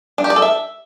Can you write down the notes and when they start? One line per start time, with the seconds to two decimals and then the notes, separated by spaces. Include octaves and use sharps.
0.18 D4
0.24 G4
0.30 D5
0.36 A4
0.42 E5